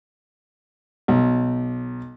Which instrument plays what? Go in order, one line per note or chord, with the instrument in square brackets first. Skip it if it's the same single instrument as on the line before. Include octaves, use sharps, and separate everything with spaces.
[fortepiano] B1